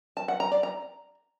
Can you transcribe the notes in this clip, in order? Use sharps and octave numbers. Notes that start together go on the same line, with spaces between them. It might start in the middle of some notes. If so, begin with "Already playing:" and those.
A5
F#5
A#5
D5
A#5